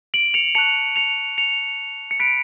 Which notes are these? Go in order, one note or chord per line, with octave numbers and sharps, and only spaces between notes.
D7 F#7
C#7 F7
A5 C#6 F#6 C#7 F7
C#7 F7
C#7 F7
C#7
B5 F#6 B6 D7